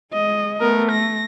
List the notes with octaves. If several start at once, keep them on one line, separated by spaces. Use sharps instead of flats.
G#3 D#5
A3 B3 A#4
A#6